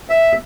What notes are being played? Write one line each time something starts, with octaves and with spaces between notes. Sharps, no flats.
E5